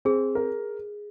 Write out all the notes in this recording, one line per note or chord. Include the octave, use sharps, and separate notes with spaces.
C4 G#4
A#4